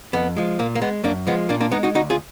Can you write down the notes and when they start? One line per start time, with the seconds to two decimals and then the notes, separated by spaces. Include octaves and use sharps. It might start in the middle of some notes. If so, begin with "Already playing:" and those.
0.13 F2 B3
0.37 F3 G#3
0.59 A#2 A#3
0.75 A#3
0.81 G#3 B3
1.03 F#2 A#3 D4
1.27 F3 G#3 B3
1.49 A#2 A#3 D4
1.60 A#3 D4
1.72 G#3 B3 D#4
1.83 D#4 F#4
1.95 D2 D#4 F#4
2.10 F4 G#4